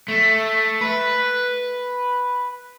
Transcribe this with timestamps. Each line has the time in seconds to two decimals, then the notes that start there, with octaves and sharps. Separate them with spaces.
0.08 A3
0.81 B4